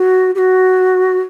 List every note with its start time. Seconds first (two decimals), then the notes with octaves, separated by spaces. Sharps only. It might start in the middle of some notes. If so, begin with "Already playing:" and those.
Already playing: F#4
0.35 G4
0.38 F#4